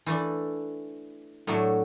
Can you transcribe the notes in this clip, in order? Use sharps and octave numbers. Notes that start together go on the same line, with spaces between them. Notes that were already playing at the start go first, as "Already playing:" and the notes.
E3 A3 D4
A2 F#3 A3 D4